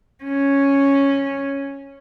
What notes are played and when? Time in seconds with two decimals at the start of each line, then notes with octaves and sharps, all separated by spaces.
0.24 C#4